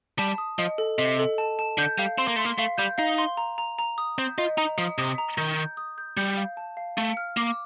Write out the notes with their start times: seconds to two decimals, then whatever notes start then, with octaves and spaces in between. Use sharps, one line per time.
0.18 G3 A5
0.38 D#6
0.58 F3 D#5
0.78 A4
0.98 C3 D#5
1.19 A4
1.38 A5
1.59 A5
1.78 D3 G6
1.98 G3 F5
2.18 C4 C6
2.28 A#3
2.36 A3 C6
2.45 A#3
2.58 A3 F5
2.78 G3 G6
2.98 D#4 F5
3.18 C6
3.37 A#5
3.58 A#5
3.79 A#5
3.98 D#6
4.18 C4 G6
4.38 F4 D#5
4.57 D#4 A#5
4.78 F3 D#6
4.98 C3 D#6
5.18 A#5
5.38 D#3 G6
5.58 G6
5.77 D#6
5.98 G6
6.17 G3 G6
6.37 F5
6.57 A5
6.77 F5
6.97 A3 F5
7.17 F6
7.37 A#3 D6